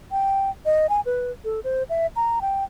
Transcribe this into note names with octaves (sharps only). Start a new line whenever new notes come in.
G5
D#5
G#5
B4
A4
C5
E5
A#5
G5